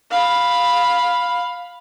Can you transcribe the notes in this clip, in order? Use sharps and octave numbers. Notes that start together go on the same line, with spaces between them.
F5 B5